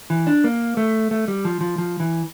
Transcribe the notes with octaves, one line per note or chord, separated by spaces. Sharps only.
E3
D4
A#3
A3
A3
G3
F3
F3
F3
E3